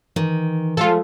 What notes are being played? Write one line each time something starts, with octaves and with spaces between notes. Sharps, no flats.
D#3 E3
F3 G#3 A3 F4 A4